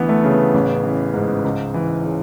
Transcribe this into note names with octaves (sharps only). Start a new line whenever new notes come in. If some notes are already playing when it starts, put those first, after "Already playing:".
Already playing: D2 E3 B3
A3
C#3
B3
A1
E3
G#2
C#2
E3
C#3